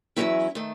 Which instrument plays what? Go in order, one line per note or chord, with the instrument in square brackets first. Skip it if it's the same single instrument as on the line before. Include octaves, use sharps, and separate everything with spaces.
[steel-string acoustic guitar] E2 D#3 F#3 C#4 E4 E5
D#3 A3